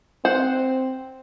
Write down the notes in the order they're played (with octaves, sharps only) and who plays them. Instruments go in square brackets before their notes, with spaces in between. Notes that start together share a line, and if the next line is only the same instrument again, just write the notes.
[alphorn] C4 [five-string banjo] C5 F#5